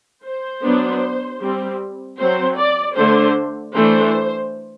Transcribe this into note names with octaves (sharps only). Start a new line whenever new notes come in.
C5
F#3 B3 D4
G3 C4
F#3 C4 C5
D5
D3 A3 D4 C5
E3 A3 D4 C5